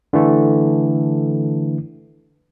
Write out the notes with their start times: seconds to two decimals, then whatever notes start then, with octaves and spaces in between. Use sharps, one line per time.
0.13 D3 E3 A3